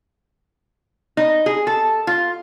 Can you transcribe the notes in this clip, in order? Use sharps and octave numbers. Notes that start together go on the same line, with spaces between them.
D#4
G#4
A4
F4